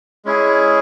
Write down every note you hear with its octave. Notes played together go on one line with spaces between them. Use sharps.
G#3 C#4 E4 G#4